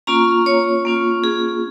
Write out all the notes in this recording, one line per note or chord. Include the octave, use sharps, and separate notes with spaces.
A#3 C#4 F4 A#5
C#5
A#3 C#4 F4
G#4